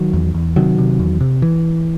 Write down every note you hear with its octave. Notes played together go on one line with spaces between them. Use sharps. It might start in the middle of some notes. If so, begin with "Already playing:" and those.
Already playing: D#3 F#3
E2
E2
C3 D#3 F#3
C3
E2
C3
E3